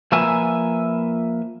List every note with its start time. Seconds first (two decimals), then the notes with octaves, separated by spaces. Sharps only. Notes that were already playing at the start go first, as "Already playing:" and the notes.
0.12 F3 A#3 B4 E5 G#5